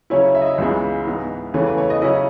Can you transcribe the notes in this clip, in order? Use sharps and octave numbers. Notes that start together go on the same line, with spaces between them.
C#3 F#3 C#4 E4 C#5
C#5
E5
D#5
E5
C#2 C#3 E3 G#3 B3 E5
G#2 E3 B3 D#4
E2 C#3 E3 A3 C#5
B4
C#5
D#5
C#3 F#3 C#4 E4 D#5